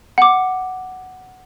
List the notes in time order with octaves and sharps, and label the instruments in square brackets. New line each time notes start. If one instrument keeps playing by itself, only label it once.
[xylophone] F#5 D6